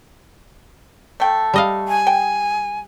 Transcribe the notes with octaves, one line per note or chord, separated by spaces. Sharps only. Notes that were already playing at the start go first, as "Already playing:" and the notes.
A3 G5
G3 D#5 F5
G#5
G5